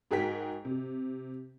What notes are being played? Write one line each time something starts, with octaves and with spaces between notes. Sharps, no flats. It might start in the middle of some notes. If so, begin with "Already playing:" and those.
G#2 F#4 G#4 A#4 G5 B6
C3